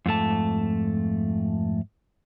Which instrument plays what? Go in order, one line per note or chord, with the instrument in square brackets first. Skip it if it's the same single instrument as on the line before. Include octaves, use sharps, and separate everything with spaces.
[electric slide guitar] F2 G#2 A3 A5